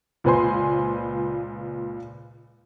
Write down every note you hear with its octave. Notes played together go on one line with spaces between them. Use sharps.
C#2 A#2 B4 C5 G#5 C6